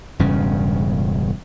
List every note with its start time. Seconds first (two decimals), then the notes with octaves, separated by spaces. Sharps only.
0.19 E1 G2 C#3 C#4